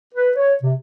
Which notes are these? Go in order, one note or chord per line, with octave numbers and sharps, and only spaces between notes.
B4
C#5
C3